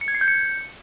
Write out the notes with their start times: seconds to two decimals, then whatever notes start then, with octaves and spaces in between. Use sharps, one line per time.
0.01 C#7
0.08 G#6
0.15 C7
0.21 G6
0.28 C#7